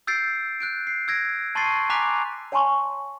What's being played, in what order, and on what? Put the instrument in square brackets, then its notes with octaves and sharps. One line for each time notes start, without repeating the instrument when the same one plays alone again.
[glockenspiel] E6 G6 A6 C7 D7
F#6 G6 D7
C7
E6 G#6 A#6 D7
A5 C6 C#6 A6 C7 D#7
G#5 A#5 D6 F#6 B6 F7
[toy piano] C#5 F#5 G#5 A5 C6 C#6